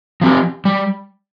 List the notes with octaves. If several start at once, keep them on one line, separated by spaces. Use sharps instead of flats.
F3 C4 G4
G3